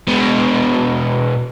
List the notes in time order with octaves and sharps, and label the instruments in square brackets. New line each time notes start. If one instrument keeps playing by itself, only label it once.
[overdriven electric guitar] B2 G#3